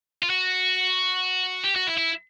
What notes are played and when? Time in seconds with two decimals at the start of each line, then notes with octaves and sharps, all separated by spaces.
0.23 F4
0.30 F#4
1.64 G4
1.76 F#4
1.87 E4
1.98 E4